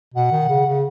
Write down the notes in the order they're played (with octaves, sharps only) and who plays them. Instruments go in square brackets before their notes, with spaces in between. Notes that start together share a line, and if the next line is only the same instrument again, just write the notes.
[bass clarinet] B2 [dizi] F#5
[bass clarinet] D#3
C#3
C#3